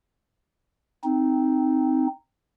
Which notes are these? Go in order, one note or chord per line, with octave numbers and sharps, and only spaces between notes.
C4 D#4